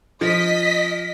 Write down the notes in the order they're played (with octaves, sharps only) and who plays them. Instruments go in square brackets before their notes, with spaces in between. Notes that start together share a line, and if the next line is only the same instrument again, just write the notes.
[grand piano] F3 [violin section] D#5 B6